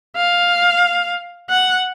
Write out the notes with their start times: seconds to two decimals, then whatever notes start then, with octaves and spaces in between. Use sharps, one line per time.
0.16 F5
1.50 F#5